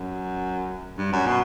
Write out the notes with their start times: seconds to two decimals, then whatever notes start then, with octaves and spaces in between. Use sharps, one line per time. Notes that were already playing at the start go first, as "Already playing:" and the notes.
Already playing: F#2
0.98 G2
1.12 F#2
1.26 B2